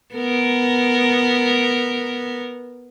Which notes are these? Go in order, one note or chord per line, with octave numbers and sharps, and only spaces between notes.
B3 A#4